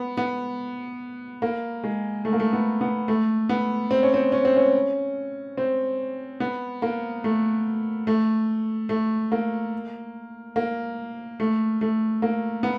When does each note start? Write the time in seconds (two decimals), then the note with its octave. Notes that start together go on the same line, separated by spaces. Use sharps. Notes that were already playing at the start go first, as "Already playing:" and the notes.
Already playing: B3
0.17 B3
1.42 A#3
1.84 G#3
2.25 A3
2.33 A#3
2.40 A3
2.53 B3
2.81 B3
3.08 A3
3.49 B3
3.91 C4
4.03 C#4
4.14 C4
4.32 C#4
4.45 C4
4.56 C#4
5.57 C4
6.40 B3
6.82 A#3
7.24 A3
8.07 A3
8.89 A3
9.32 A#3
10.56 A#3
11.40 A3
11.81 A3
12.22 A#3
12.63 B3